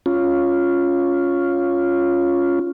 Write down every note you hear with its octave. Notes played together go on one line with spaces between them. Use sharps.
C#4 F4